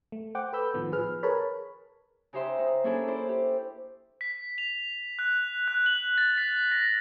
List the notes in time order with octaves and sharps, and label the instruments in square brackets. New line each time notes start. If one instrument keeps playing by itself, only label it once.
[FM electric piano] A3
C5 F#5 G5 D6
A4 B4 B5 E6 G6
A2 D#3 F3 B3
F3 G#4 B4 F6
G#4 A#4 B4 C#5 A5 B5
[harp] C#3 D#4 G4 C5 E5 C6
D#4
A#3 C#4 D4 E4 G#4 A4
E4 C5 D5
G4
[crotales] B6
F7
F#6
F#6
F#7
A6
B6
A#6